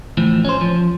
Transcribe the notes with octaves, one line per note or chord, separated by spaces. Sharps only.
A2 E3 F3
C#4 C5
F3